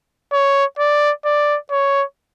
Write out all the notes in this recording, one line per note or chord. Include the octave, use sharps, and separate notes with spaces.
C#5
D5
D5
C#5